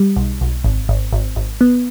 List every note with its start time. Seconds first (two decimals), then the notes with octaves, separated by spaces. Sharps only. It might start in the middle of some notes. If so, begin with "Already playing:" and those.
Already playing: G3
0.16 B1
0.41 B1
0.64 G#1
0.89 G#1
1.13 G#1
1.36 G#1
1.61 B3